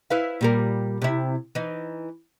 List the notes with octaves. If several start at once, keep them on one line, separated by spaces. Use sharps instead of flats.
E4 B4 F5
A#2 G3 A#4
C3 E4
E3 D#4